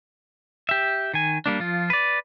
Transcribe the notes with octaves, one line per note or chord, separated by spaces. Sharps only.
G4 E5
D#3 G#5
G3 A#3 D4
F3 F4
B4 D5